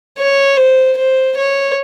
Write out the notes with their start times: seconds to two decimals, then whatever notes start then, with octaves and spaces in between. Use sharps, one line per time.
0.18 C#5
0.57 C5
0.97 C5
1.37 C#5